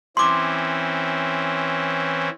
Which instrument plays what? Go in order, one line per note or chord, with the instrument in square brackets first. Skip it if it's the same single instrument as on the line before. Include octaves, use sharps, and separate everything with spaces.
[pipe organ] E3 C4 C#4 [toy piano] C6 D6